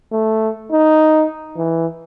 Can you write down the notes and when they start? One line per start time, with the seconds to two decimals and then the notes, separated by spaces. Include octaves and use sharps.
0.12 A3
0.72 D#4
1.57 E3